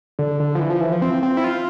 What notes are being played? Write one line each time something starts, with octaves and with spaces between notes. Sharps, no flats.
D3
D3
F3
E3
F3
E3
F3
C4
C4
E4
F4